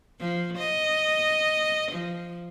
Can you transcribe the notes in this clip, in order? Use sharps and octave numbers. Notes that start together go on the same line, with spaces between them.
F3
D#5
F3